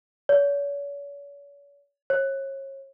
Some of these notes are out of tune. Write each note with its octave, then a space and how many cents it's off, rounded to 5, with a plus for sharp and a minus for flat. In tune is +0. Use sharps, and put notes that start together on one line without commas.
C#5 +40
C#5 -30